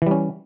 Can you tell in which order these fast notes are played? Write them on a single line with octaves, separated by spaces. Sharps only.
E3 G3 C#4